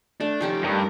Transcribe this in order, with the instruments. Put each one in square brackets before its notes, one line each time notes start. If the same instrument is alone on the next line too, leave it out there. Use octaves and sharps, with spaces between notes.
[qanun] A3 [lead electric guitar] D4
[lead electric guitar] F3 G4 [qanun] C#4 D#4 A4
[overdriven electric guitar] G2 [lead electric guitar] A#4